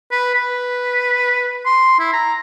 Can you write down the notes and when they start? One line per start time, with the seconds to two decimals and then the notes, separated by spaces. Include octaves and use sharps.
0.12 B4
0.34 B4
1.66 C6
1.99 E4
2.13 A#5